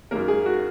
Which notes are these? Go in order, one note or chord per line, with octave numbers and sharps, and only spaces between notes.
F#2 D#3 G#3 A#3 A#4
G#3 G#4
F#4